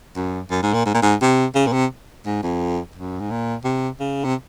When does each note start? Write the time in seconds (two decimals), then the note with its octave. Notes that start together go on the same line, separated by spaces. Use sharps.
0.16 F#2
0.51 F#2
0.62 G#2
0.74 A#2
0.86 G#2
0.94 A#2
1.02 G#2
1.21 C3
1.55 C#3
1.67 A#2
1.73 C3
2.26 G#2
2.43 F2
2.96 F#2
3.20 G#2
3.31 A#2
3.64 C3
4.00 C#3
4.24 C3